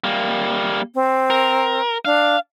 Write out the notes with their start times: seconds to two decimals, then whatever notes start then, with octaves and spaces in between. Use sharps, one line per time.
0.04 G3 A#3
0.95 C4
1.30 A#4
2.05 D4 F5